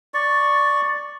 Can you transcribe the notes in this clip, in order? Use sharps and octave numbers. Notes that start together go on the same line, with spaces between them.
D5 C#6